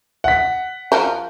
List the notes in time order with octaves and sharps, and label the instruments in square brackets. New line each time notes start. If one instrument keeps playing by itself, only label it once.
[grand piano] F#5 B6
[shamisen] F3 A#4 C5